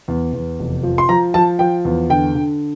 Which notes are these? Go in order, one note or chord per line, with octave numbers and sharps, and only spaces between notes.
E2
E2
F1
F3
C6
F3 A#5
F3 A5
F3 G5
E2
D3 G5
D3